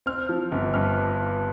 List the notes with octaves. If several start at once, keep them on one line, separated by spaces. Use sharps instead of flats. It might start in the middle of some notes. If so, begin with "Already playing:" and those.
C4 F6
F3
G1
G2 F6